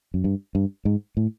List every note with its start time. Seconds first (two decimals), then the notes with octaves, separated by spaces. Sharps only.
0.14 F#2
0.24 G2
0.55 G2
0.85 G#2
1.17 A2